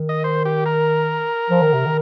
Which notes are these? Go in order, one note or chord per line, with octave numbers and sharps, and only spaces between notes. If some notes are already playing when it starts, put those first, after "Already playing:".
Already playing: D#3
D#5
C5
G4
A#4
F3
D#3
C3
D#3